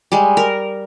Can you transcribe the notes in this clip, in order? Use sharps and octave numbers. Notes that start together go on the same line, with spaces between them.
G3 G#3
A#4